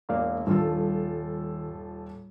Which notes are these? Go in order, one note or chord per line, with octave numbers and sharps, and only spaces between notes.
E1 A#3 D5 F5
D#1 G2 D#3 F4 A4